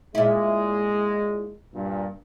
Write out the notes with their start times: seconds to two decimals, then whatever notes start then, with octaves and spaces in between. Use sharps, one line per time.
0.15 A#2 G#3 E4
1.74 G2 A#2